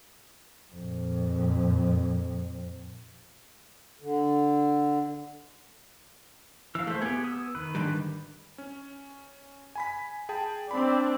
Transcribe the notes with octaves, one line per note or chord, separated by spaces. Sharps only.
F2 A#2
D3
E3 F5 E6
A3 G#4 C5
B3 G4 G#5
D#6 E6
D#3 B4
G#2 D3 G3
C#4
G#5 B5 B6
G#4 G5 A5
C4 D4 D5 B5